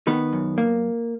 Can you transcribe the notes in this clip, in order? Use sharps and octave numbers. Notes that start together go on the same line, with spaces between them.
D#3 B3 B4
F#2
A#3